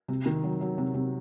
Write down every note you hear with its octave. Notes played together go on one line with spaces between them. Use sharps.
C3
D#3
F#3
F#3
C3
C3